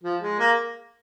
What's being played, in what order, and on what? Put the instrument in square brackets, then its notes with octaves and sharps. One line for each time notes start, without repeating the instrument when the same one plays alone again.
[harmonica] F3
G#3
A#3